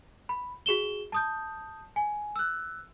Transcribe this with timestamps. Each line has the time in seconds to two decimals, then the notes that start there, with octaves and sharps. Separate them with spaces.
0.29 B5
0.66 F#4 G#4 E7 G7
1.12 A5 D#6 G6
1.96 G#5
2.36 E6 F#6